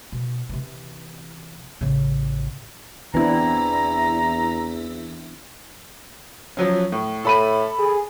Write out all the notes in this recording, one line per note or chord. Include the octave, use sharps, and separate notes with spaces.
B2
C3 E3
A1 C#3
E2 E3 B3 C4 D4 E4 A#5
F3 F#3 C#4
A2
A2 A4 B5 D#7
G#4